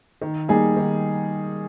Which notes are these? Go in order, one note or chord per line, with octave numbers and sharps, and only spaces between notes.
D#3
G3 A#3 D#4 G#4
D#3